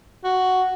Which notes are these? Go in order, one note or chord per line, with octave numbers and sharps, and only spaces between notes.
F#4